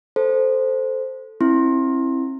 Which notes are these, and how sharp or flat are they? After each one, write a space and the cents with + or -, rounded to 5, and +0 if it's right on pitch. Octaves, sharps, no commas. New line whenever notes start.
A4 +0 C5 -5
C4 +35 E4 +0 C6 +25